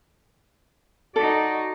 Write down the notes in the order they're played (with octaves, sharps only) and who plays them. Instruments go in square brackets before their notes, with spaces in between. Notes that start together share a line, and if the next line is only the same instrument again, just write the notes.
[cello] D#4 D5 [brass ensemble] F#4 [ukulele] A4